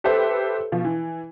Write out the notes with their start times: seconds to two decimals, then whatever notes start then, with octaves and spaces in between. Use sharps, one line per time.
0.04 G4 A4 B4 C5 E5
0.72 B2 F3
0.85 E3